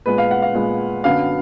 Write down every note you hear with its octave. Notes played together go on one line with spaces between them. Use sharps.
A#2 G#3 B3 B4
F5
F#5
F5
A#2 G#3 B3
F#2 D3 F#3 B3 F5